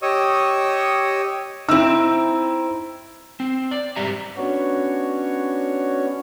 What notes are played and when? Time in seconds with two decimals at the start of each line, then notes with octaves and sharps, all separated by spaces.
0.02 G4 C#5 D#5 C#6 D#6 E6
1.69 C4 D#4 E4 E6
3.40 C4
3.71 D5
3.96 G#2 G3 G4 E5 A#5
4.37 B3 C#4 D4 F#4 C#5